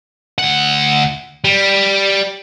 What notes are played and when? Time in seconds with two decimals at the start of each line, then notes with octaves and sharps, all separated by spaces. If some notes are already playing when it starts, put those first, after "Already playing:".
0.38 D2 F#5
1.45 G3